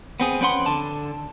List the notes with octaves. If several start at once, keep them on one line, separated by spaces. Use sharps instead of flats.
B3 C4 G#4
F2 C4 C#4 B4 F#5 C6
D3 A5